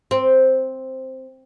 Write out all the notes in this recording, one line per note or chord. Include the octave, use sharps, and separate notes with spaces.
C4